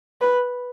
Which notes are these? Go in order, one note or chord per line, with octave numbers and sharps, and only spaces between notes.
B4